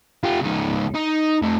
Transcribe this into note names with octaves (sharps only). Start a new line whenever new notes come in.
F4 G4
C#2 D#4
D#4
F2 A3